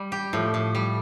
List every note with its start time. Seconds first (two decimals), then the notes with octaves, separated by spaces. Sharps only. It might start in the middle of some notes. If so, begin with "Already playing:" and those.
Already playing: G3
0.12 G4
0.33 A2 F3 A3
0.54 A2
0.75 G3